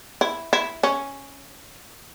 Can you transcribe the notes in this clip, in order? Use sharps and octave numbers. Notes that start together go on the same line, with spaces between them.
E4
E4
C#4